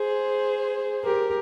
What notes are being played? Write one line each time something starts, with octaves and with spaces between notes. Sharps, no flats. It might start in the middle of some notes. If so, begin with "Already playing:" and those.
Already playing: G#4 C5
G4 A#4